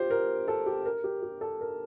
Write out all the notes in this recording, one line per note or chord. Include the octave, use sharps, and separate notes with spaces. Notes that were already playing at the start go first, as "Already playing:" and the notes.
Already playing: F4 G4 C5
A#4
A4
G4
A#4
G4
G4
A4
A#4